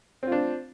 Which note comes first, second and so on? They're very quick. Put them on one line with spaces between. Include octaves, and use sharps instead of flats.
C4 F4 D4